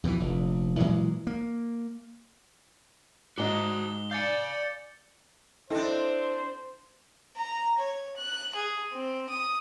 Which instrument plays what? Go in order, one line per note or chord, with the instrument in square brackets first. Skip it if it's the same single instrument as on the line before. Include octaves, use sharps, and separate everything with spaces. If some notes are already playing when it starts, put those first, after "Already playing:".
[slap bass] F2 B2 D#3 E3
F1 A#1
A#2 E3 F#3 G#3
A#3
[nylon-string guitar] G#2 D#5 [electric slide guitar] F#4 C5 [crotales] D6 G7
[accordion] D5 [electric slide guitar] F5 G#5 [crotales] G6 A6 C#7
[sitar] C4 D4 [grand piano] E4 A4 D#5 [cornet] C5
[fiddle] A#5
C#5
F#6
G#4
C4
D#6